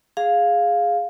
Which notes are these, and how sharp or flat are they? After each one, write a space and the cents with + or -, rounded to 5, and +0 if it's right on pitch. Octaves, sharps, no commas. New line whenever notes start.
G#4 +0 F5 +5